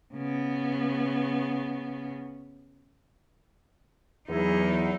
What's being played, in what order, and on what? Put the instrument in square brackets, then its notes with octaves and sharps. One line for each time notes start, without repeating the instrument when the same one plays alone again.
[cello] C#3 B3
[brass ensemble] E2 E4 [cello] F#3 D#4